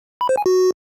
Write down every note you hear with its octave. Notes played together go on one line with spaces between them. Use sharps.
B5
C5
G#5
F#4